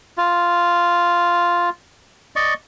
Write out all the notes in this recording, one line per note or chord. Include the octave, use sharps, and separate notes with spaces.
F4
D5 D#5 C#6